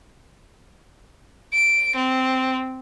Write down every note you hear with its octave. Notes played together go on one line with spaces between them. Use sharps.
D7
C4